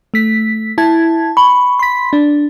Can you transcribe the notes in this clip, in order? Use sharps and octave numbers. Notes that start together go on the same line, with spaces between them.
A3 B6
E4 A5 G#6
B5 C#6
C6 B6
D4